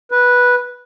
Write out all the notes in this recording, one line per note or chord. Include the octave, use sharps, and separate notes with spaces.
B4